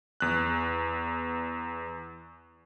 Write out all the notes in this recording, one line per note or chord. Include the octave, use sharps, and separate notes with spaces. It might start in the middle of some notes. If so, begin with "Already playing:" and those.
E2 F#6